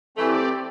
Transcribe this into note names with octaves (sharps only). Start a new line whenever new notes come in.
E3 A3 C4 G4 D5